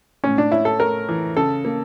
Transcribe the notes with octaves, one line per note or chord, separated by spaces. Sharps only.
A2 C#4
D4
C#4 E4
A4
A3 A#4
E3
C#3 A4
A#3